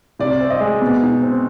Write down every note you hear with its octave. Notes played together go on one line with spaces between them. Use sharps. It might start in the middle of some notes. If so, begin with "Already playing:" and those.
C3 D5
C4
D#5
G#3
B2
D#4
C4